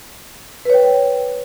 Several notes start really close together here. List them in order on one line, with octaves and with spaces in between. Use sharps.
B4 C#5 G5